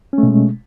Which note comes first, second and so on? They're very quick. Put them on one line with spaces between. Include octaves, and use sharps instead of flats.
C#4 A3 B2 G#3